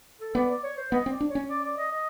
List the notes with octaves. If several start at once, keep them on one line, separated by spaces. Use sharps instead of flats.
A4
B3 D5
D5
C#5
C5
B3 D#5
C4
D5
D4
C#5
C#4
D5
D5
D#5
D#5